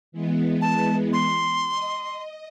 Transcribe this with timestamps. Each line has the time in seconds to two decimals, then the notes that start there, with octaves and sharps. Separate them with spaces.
0.12 E3 G#3 B3
0.61 A5
1.13 C6
1.69 D#5